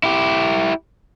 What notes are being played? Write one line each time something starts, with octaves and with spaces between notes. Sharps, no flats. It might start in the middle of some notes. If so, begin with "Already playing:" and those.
E4 G4